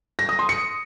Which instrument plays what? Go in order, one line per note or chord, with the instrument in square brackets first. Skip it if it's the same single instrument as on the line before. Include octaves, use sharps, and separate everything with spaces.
[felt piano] A#6
D#6
C6
C#7